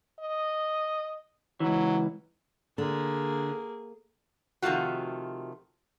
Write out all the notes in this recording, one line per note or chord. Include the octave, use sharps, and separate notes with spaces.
D#5
C#2 E3 F#3
D3 A#3 G#4
C3 D#3 F3 A3 F4 F#4